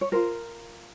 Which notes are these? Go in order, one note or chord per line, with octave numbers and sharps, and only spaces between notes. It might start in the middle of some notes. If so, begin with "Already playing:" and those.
C#5
F4 A#4 C5